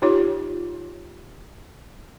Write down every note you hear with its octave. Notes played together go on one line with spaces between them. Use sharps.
D#4 F4 G4 C#5